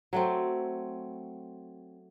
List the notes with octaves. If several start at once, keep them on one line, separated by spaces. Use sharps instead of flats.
F#3 A3 C4